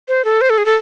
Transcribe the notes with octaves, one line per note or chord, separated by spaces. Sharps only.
C5
A4
C5
A4
G#4
A4